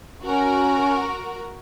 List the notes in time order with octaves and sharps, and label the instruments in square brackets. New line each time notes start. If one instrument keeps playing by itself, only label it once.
[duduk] C#4 [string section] F#4 A#4